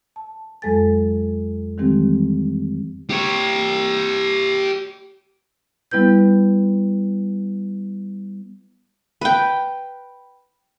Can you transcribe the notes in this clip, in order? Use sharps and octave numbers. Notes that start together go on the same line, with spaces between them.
A5
F2 F#3 G#3 A4 G#5 A6
D#3 E3 G3 G#3 C4 G4
G4 C#5
G3 B3 E4 B4 G6
B4 G5